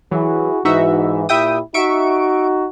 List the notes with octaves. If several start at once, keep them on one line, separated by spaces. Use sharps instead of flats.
E3 F#3 E4 F#4 G#4
G#2 E3 D#4 F#4 E5
A#2 E4 G4 E5 G5 D#6
D#4 F#4 E5 C#6 D7